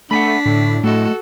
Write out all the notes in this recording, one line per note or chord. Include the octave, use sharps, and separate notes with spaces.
A3 D4 F#5 G#5 B5 B6
A2 D3
A2 A3 F#4 A4 D#5